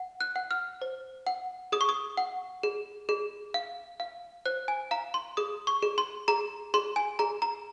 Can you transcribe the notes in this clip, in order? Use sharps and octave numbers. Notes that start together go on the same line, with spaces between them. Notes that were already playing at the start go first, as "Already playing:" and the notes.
Already playing: F#5
F#6
F#5
F6
C5
F#5
G#4 D#6
C#6
D#6
F#5
G#4
G#4
F5
F5
C5 F#6
G#5
F5 A#5
C6
G#4 D#6
C#6
G#4
C6
G#4 A#5
G#4 C6
G#5
G#4 A#5
A#5